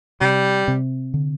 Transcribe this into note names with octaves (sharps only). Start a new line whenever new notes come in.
C3 G3
C3
D3